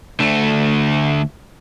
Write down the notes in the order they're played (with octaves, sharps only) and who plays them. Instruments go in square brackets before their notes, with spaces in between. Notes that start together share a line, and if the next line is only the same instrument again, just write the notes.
[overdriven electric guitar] D2 A3